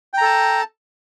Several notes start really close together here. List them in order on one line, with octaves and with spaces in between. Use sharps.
G5 A#5 A4 A5